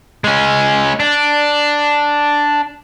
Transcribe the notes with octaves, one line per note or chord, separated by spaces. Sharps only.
G#3 C#4
D4